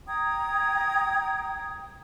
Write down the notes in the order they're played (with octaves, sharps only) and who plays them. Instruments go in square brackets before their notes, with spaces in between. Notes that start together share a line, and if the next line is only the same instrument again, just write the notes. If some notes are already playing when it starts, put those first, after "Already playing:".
[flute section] G5 A#5 D#6 G#6